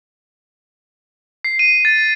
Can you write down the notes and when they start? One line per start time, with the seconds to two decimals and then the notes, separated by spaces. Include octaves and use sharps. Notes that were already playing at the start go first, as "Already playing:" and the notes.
1.44 C7
1.59 D#7
1.85 A6